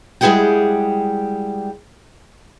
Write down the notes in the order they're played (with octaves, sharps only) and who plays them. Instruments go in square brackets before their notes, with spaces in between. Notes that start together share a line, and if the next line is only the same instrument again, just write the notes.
[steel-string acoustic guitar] G3 G#3 E4 G#4 F#5 G5